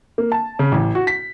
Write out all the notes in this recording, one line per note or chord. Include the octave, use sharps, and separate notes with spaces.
A#3
A5
C#3
A1
F#4
B6